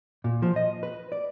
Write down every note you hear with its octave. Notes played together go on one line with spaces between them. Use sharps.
A#2
F3
D#5
B4
D5